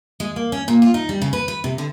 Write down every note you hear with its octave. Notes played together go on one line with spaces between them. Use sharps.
G#3
A#3
C#4
A#2
F4
D#4
G3
C#3
B4
B4
C3
D3